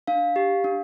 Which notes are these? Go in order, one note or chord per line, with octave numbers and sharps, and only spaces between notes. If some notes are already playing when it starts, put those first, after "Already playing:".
D4 F5
G4
D4